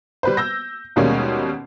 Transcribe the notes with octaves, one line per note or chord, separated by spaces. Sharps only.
G3 B4 C5
E6 G6 A#6
D#2 B2 G3 G#3 A#3 C#4